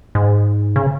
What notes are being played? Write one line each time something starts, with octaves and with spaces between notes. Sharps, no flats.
G#2
C#3